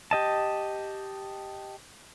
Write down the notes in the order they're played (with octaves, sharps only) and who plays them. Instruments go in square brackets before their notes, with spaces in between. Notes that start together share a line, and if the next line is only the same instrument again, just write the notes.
[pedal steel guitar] G4 D#5 A5